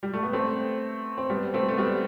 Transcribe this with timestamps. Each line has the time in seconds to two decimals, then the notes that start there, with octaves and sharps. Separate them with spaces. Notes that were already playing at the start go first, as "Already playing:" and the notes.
0.03 G3
0.13 A3
0.23 B3
0.33 A3 C4
1.18 C4
1.30 G3 B3
1.54 A3 C4
1.68 A3
1.78 G3 B3